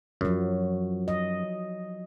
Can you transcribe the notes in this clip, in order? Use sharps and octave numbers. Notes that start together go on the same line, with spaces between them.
F#2 F3 F#3
D#5